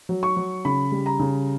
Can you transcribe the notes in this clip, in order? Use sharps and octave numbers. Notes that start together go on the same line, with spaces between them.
F#3
C#6
F#3
C#3 B5
G3
A#5
C#3